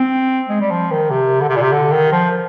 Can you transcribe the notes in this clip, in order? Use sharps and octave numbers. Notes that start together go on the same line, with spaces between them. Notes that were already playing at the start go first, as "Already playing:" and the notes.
Already playing: C4
G#3
G3
F3
D#3
C3
D3
C3
A#2
C3
D3
D#3
F3